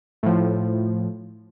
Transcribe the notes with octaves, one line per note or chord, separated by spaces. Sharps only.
A2 F3